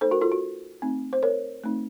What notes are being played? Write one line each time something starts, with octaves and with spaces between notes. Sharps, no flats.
A3 D#4 A4 C5
F#4 A#4
F4 A4
F#4
A3 C4 D#4
C5
A#4 C#5
A3 C4 D#4